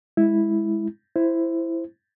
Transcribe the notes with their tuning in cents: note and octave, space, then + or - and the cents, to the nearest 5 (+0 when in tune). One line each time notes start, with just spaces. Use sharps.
G#3 +0 E4 -5
E4 +10 C5 +0